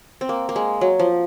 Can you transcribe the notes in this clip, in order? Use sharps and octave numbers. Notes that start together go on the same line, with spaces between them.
C4
A#3
A#3
G#3
F#3
F3